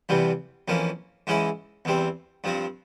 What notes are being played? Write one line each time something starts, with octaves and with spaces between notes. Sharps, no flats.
E2 C3 E3 G3
F2 E3 A#3 C#4
G#2 E3 G#3 C#4 E4
E2 E3 G3 C4
G2 F3 C4